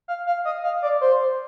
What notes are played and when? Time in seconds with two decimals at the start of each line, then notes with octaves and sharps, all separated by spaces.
0.08 F5
0.27 F5
0.45 D#5
0.64 F5
0.82 D5
1.01 C5